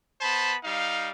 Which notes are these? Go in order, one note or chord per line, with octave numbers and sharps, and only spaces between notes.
B3 C5 A5 B5
G3 D#4 F5